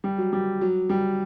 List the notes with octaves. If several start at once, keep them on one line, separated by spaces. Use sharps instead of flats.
G3
F#3
G3
F#3
G3